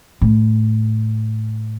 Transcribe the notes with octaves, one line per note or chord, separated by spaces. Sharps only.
A2